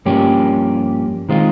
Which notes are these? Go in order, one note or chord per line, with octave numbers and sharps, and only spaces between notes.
G2 F3 A#3 C#4 G4
D#3 G#3 C4 F4